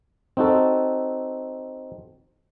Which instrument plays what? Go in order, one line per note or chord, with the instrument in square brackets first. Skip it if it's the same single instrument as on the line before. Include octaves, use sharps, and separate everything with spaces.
[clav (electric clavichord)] C4 D#4 F#4 A4